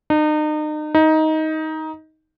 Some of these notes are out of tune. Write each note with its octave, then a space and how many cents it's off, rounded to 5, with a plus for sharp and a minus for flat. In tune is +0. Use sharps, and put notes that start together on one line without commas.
D#4 -35
D#4 +15